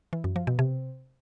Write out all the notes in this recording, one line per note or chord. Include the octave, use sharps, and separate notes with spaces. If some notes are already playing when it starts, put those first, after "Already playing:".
E3
F#2
F3
B2
C3